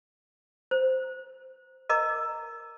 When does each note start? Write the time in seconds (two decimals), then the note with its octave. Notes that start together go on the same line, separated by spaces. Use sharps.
0.71 C5
1.89 A#4 D#5 A#5 D6